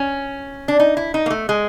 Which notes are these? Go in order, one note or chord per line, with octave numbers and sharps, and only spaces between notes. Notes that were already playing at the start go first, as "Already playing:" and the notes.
Already playing: C#4
D4
D#4
E4
D#4
A#3
A3
G#3